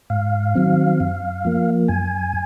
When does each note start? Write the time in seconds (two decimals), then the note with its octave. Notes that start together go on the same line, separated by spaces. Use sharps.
0.10 G#2 F5
0.55 D#3 F#3 C4
1.00 F#2
1.45 F3 A#3
1.88 F#2 G#5